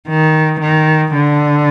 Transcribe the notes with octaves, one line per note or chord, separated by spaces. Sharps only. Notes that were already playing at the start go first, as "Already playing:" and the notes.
D#3
D#3
D3